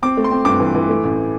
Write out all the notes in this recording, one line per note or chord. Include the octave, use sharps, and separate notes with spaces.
C4 D6
A3
C6
C4
G2 D6
E3
E3
A3
A1